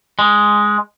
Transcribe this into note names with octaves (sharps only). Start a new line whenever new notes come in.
G#3